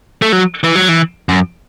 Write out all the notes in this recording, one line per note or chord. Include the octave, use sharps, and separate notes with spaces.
A3
F#3
E3
F#3
E3
F#2